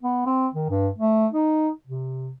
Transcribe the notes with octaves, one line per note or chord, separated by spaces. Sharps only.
B3
C4
D#3
G2
A3
D#4
C3